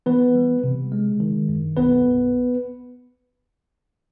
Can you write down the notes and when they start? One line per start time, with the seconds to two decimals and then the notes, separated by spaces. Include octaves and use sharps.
0.06 E3 B3 B4
0.35 G3
0.64 C3
0.92 G#3
1.20 D#3
1.49 F#2
1.77 B1 B3 B4
2.05 B1